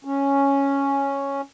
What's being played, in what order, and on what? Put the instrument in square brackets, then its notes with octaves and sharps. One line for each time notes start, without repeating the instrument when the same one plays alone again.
[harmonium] C#4